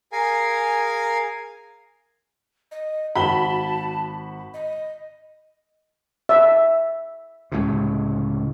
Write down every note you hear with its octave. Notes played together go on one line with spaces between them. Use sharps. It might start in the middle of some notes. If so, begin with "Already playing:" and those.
G#4 A#4 F5 G#5
D#5
G#1 F#4 A5 B5 G7
D#5
E5
C#2 A2 C3